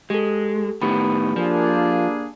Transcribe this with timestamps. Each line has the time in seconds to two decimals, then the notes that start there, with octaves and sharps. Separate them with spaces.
0.10 G#3 G4 A4
0.82 A2 D#3 B3 G4 B5
1.36 F3 A#3 D4 G#4